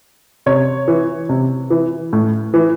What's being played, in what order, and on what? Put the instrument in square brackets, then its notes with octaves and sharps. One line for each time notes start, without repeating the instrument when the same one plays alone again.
[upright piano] C3 C#5
E3
C3
E3
A2
E3